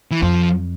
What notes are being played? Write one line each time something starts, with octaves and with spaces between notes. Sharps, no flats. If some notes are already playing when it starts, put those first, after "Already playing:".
E3
F2 F3